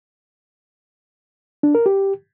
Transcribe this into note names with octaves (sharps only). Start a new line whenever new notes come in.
D4
A#4
G4